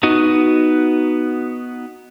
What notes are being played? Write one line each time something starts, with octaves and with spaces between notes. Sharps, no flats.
B3 D#4 F#4 D#5